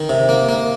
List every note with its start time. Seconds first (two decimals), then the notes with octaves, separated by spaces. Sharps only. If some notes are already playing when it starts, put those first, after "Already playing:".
Already playing: D#3
0.09 C3
0.29 A#3
0.49 A#3